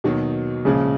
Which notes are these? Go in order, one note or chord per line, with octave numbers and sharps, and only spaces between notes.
D#2 B2 D#3 F#3
A#1 A#2 C#3 F3 G#3